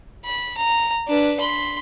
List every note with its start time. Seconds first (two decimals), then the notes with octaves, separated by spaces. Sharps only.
0.25 B5
0.57 A#5
1.08 D4 B4
1.40 B5 C6